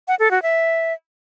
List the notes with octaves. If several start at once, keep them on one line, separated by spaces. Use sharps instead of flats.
F#5
A4
F#4
E5